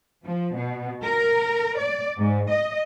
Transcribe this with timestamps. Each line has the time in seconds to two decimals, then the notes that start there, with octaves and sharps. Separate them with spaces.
0.25 F3
0.56 B2
1.04 A#4
1.79 D5
2.18 G#2
2.50 D#5